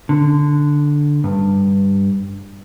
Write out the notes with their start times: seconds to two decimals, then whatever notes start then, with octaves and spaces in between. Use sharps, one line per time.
0.09 D3
1.24 G2